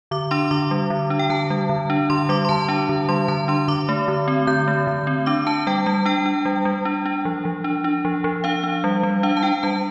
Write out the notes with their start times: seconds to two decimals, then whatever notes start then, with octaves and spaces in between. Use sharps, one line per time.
0.11 D3 D6
0.31 D4 C6
0.51 D3 D6
0.71 G3
0.90 D3
1.10 D4
1.19 G5
1.30 D3 A5
1.50 G3
1.69 D3
1.90 D4
2.10 D3 C6
2.29 G3 D6
2.45 C6
2.49 D3 A5
2.69 D4 A5
2.89 D3
3.09 G3 C6
3.28 D3 A5
3.48 D4 C6
3.68 D3 D6
3.89 A3
4.08 D3
4.28 C4
4.47 D3 G6
4.68 A3
4.87 D3
5.07 C4
5.26 D4 D6
5.47 D4 A5
5.67 G3 G5
5.86 G3 A5
6.06 D4 G5
6.26 D4
6.45 G3
6.65 G3
6.85 D4
7.05 D4
7.25 F3
7.45 F3
7.64 D4
7.84 D4
8.05 F3
8.24 F3
8.44 D4 F5
8.64 D4
8.84 G3
9.03 G3
9.23 D4 F5
9.37 A5
9.43 D4 G5
9.63 G3 A5